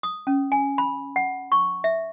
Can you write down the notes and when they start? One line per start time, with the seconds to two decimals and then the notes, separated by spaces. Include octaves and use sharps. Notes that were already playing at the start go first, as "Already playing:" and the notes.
0.03 D#6
0.27 C#4
0.52 G#5
0.78 B5
1.16 F#5
1.52 C#6
1.84 E5